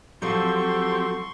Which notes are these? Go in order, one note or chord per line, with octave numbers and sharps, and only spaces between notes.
F3 F#3 C4 G4 A4 C6 C#6